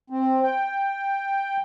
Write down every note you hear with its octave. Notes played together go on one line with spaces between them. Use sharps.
C4
G5